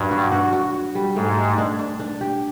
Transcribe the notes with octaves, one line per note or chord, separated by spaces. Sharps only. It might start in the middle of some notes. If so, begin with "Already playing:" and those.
Already playing: G2 D3 F#3 D4
F#4
F#4
F#4
F#4
G3
G#2 A3
G4
D4
D4
D4
G4